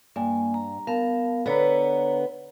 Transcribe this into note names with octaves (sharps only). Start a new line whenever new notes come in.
G2 A#3 G#5
A#5
B3 A#4 F5 A5
D3 B3 B4 C#5 A#5